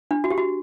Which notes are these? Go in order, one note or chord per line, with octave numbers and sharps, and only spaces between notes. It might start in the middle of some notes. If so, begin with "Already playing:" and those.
D4
F#4
G4
F#4